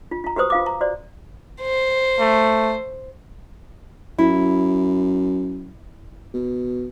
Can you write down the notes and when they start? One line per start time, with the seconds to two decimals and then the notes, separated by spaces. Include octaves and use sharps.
0.11 F4
0.24 F4 A#5
0.36 F#4 G4 B4 C5 D#6
0.50 F4 F5 D6
0.66 A#5
0.81 F#4 C5 D5
1.61 C5
2.20 A3
4.18 F#2 E4
6.34 B2